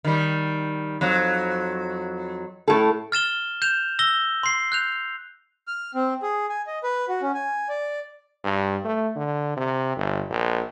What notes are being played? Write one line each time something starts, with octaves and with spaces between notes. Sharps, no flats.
D#3 G3
F2 F#3
A2 A4
F6 A6 E7 G7
G6 E7 F7
E6 A#6 G7
C6 C7
F#6 G6 F7
F6
C4
G#4
G#5
D#5
B4
F#4
C#4
G#5
D5
G2
A3
D3
C3
G1
A#1